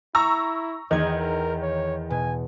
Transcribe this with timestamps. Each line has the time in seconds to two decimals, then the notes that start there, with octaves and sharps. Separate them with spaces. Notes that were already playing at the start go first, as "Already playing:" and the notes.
0.15 E4 A#5 C#6 E6
0.91 E2 D#3 D#5 G#6
1.20 A#4
1.62 C#5
2.10 B2 G#5